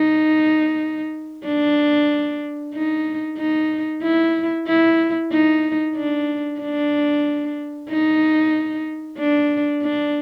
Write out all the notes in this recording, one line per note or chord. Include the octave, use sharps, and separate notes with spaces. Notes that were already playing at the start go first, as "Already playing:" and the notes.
Already playing: D#4
D4
D#4
D#4
E4
E4
D#4
D4
D4
D#4
D4
D4